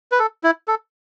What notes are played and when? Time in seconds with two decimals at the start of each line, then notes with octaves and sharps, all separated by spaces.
0.12 B4
0.19 A4
0.43 E4
0.68 A4